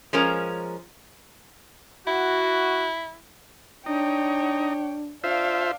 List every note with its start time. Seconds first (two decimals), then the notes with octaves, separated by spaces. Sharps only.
0.13 F3 G#3 C#4 A#4 A#5
2.07 E4 F#4
3.86 D4 D#4 C#5 G5
5.24 D4 F4 C5 E5 F5